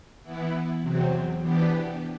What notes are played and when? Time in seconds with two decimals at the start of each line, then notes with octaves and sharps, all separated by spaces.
0.23 E3 B3 E4
0.82 E2 C3 F#3 C4
1.40 E3 B3 D4 G4